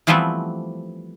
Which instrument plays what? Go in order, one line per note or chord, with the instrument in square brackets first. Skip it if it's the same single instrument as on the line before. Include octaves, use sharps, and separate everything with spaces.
[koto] E3 F3 G3 A3 B3 C4